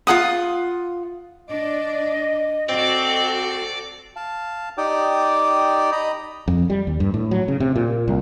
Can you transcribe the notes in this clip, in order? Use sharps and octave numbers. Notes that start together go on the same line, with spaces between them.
F4 A4 F#5 D#6
D4 D5 D#5
C4 F#4 A4 D5
F5 A5
D#4 G4 D5 G5 D6 D#6
D#5 A#5 B5 D#6
F2
G3
D#2
G2
A2
F#3
C#3
C3
A#2
C2